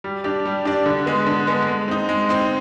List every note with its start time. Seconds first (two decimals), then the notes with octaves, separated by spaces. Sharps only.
0.04 G3
0.24 D4 G4 D5
0.45 G3
0.65 D4 G4 D5
0.86 D3
1.06 G#3 B3
1.27 D3
1.47 G#3 B3
1.68 G#3
1.88 C4 D#4
2.09 G#3
2.29 C4 D#4